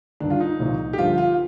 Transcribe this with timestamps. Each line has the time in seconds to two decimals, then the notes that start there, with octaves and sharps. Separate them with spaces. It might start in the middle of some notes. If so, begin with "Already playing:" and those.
0.20 G2 D#3 D4
0.30 F4
0.40 D#4
0.59 C2 A#2 F3
0.93 G4
0.98 G2 D3 F3 F4
1.18 F4